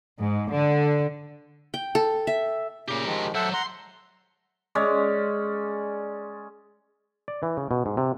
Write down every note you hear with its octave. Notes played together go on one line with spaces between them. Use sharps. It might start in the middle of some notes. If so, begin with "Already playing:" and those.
G#2
D3
G5
A4
E5
A#2 C#3 G4 A#4
D#3 F3 G#3
F#3 A4 C5 E5 F#5
F#5 A#5 C6
G#3 C#4 D5
D5
E3
C#3
B2
G#2
C3